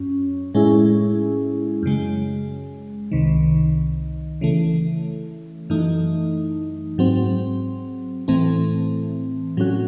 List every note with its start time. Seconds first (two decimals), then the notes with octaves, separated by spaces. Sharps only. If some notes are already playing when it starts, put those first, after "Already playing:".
Already playing: F#2 C#4
0.54 A2 G#3 C#4 E4 G#4
1.83 F#2 C#3 G#3
3.11 C2 C3 D#3
4.41 C#3 E3 A3
5.70 F#2 E3 A3 D#4
6.98 G#2 F#3 C4
8.28 A2 E3 A3 C4
9.57 A2 F#3 C#4 F#4